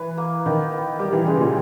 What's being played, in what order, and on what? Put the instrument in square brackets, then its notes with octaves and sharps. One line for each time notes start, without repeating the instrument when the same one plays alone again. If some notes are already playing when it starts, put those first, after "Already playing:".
Already playing: [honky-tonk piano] E3 [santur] B4
[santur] A#3
[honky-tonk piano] D#3 [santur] B3
[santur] B3
[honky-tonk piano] G3 [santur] G4
[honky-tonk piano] E3
[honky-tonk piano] C#3 [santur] G#3
[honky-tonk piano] A#2